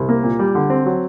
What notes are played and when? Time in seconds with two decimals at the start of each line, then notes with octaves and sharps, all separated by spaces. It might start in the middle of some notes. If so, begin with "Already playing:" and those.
Already playing: C2
0.09 A#3
0.24 A#2
0.39 G3
0.55 D3
0.70 C4
0.86 F#3